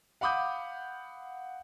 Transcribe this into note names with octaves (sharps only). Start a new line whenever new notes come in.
F5 F#5 B5 D6 D#6 G6